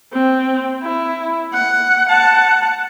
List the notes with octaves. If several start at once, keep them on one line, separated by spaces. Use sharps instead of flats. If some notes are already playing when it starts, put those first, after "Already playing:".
C4
E4
F#5
F#5 A5